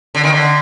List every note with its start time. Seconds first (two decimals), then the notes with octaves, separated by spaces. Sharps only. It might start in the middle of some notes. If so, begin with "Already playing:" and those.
0.15 D3
0.24 D#3
0.33 D3